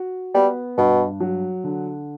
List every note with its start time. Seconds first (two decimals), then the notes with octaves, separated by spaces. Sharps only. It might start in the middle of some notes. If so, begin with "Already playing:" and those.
Already playing: F#4
0.34 G3 B3
0.77 G2 B2
1.20 F#3
1.64 D3